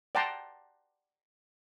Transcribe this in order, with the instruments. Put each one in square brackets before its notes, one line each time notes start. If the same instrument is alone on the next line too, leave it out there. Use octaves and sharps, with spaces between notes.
[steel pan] D5 F#5 G5 A5 A#5 C6